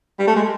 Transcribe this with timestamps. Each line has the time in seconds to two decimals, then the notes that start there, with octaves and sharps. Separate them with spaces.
0.19 G3
0.27 A3
0.36 G#3